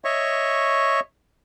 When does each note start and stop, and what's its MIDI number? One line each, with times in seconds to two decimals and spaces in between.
0.04 1.00 73
0.04 1.00 75
0.04 1.00 76
0.04 1.00 85